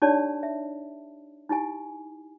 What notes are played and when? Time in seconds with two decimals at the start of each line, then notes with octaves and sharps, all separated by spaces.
0.02 D4 D#4 G4 C#5 D5 A5
0.43 E5
1.49 D#4 E4 G4 G#5